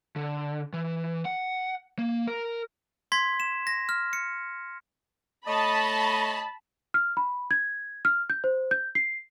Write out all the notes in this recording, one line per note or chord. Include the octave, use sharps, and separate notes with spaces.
D3
E3
F#5
A#3
A#4
C6 G#6 B6
E7
A#6
F6
C#7
A3 C#5 D#5 A5 B5
F6
B5
G#6
F6
G6
C5
G6
C7